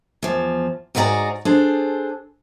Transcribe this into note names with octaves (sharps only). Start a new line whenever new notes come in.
E2 F3
G#2 F#4 G#4 B4 D5 A#5
D4 G#4 A4 C5